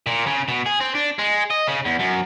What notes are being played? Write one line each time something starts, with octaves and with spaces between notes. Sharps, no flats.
A#2
C#3
B2
G#4
C4
D4
G#3
D#5
C#3
E2
F#2